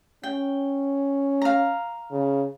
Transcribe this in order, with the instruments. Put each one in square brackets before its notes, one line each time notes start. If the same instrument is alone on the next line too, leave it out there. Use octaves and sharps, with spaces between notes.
[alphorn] C#4 [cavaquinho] G5
[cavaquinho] F5 A#5
[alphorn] C#3